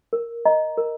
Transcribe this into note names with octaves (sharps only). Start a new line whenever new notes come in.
A#4
D#5 A#5
A#4